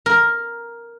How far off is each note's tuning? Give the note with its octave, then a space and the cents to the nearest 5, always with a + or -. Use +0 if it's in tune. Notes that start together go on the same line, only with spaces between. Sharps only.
A#4 +5